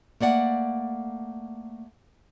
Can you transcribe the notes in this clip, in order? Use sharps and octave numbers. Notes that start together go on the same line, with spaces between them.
A3 A#3 D5 F#5